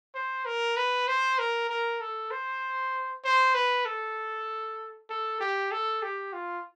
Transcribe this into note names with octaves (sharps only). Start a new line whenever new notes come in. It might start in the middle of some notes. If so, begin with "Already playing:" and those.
C5
A#4
B4
C5
A#4
A#4
A4
C5
C5
B4
A4
A4
G4
A4
G4
F4